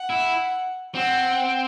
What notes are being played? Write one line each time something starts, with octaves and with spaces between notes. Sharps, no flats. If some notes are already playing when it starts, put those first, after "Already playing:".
Already playing: F#5
E4
C4 F#5